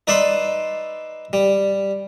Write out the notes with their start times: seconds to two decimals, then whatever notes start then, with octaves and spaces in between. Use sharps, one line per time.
0.07 D#4 B4 D5 E5 B5 C6
1.33 G3